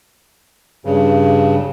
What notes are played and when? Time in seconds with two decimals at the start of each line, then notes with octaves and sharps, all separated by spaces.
0.85 G2 C#3